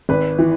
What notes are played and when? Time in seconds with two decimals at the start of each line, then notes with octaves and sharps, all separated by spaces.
0.09 G#1 B4
0.39 E3